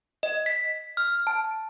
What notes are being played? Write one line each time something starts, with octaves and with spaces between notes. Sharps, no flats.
D#5
B6
F6
A5